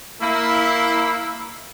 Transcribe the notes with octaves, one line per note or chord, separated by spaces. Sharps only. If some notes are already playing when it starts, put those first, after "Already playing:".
A#3 E4